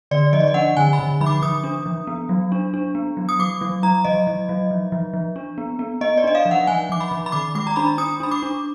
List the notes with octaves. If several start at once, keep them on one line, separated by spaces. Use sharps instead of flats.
D3 D5
F3 D#5
D5
D#5
D4 F#5
D3 G#5
B5
D3
F3 B5
D6
F3 D#6
D4
F3
B3
F#3
D4
D4
B3
F#3
D#6
F#3 D6
F#3
F#3 A#5
F#3 D#5
F#3
F#3
F3
F3
F3
D4
B3
B3
B3 D#5
D5
D4 D#5
F5
F3
F#5
F3 G#5
F3 D6
B5
F3
B5
D#3 D6
G#3 D6
A#5
D4 B5
D4 D#6
D4 B5
D6
D4